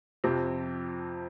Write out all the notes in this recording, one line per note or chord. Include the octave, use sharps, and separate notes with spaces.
F2 C3 F3 C4